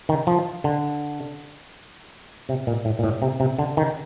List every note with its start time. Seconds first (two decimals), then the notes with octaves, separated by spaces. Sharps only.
0.09 D#3
0.27 F3
0.64 D3
2.49 C3
2.67 A#2
2.85 A2
2.99 A#2
3.04 A2
3.22 C3
3.40 C3
3.59 D3
3.77 D#3